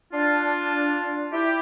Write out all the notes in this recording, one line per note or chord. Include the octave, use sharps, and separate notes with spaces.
D4 F4
E4 G4